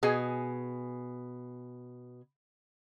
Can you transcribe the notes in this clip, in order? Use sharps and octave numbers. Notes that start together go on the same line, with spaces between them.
B2 G#4 G#5